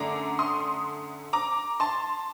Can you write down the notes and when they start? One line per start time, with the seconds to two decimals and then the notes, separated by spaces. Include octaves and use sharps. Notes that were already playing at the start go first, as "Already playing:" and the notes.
Already playing: F#2 D3 A3 D4 A#5 D6
0.39 C6 D#6
1.33 A#5 D6
1.80 A5 C6